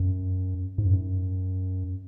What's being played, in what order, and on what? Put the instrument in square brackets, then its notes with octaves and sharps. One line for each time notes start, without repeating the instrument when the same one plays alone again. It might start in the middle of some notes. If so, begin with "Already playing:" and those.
Already playing: [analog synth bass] F#2
G#2
F#2